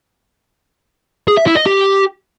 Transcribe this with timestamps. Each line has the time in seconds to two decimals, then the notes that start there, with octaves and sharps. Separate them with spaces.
1.28 G#4
1.38 E5
1.47 E4
1.57 D#5
1.66 G4